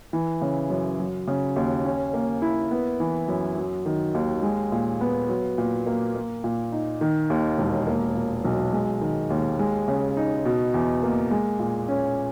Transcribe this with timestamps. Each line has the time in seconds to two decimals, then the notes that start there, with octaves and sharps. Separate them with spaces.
0.13 E3
0.41 C#3
0.70 F#2
0.99 F#3
1.27 C#3
1.56 D#2
1.85 C#4
2.13 A#3
2.42 E4
2.71 B3
3.00 E3
3.28 F#2
3.57 F#3
3.86 D#3
4.14 D#2
4.43 G#3
4.72 A#2
5.01 B3
5.29 F#3
5.58 A#2
5.86 A#3
6.15 A#3
6.44 A#2
6.72 D#4
7.01 D#3
7.30 D#2
7.58 E1
7.87 A#3
8.15 A#2
8.45 B1
8.73 G#3
9.01 D#3
9.30 D#2
9.59 G#3
9.88 C#3
10.17 D#4
10.45 B2
10.74 E2
11.03 A#3
11.31 G#3
11.59 A#2
11.88 C#4